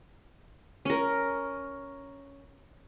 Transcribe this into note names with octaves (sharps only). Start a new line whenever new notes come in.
C#4 A#4